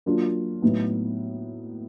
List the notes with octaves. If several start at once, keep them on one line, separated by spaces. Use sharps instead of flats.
F#3 A#3 D4 F4
A2 F#3 B3 D#4